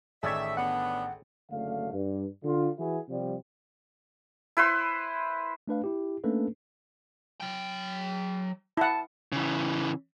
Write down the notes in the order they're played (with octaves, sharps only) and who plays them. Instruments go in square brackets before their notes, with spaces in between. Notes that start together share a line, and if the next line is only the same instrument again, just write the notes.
[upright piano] A1 D#3 D5 [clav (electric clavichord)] G#4 A4 C#5 [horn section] E5
[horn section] B3 D4 [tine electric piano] F#5
[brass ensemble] F#1 D3 A3 F5
G2
D3 F4
E3 E4 F#4 G#4 B4
C3 F3 G3
[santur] E4 B4 C5 C6
[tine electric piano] A3 D4 B4 F5
E4 G4
A3 A#3 C#4 D4 A4 B4
[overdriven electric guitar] F#3 G5
[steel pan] E4 F#5 [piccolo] A5
[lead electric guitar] C#3 E3